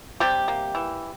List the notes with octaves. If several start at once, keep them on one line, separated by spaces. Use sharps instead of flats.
C3 G3 G4
A#3
E3